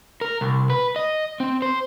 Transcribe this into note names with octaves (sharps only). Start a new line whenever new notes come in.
A#4
C2
B4
D#5
C4
C5